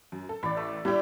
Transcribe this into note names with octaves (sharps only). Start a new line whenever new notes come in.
F#2
A4
A1 D5 B5
A3
G3 D4 E4 G4